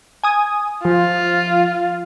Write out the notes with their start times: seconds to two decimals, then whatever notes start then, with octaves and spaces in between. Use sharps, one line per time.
0.23 G#5 D#6
0.85 F3 F4